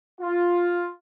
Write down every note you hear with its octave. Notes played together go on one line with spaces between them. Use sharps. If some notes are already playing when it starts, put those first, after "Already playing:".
F4